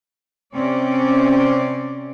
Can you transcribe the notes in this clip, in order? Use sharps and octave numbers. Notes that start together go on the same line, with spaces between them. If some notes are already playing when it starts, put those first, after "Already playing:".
C3 C4 C#4 D5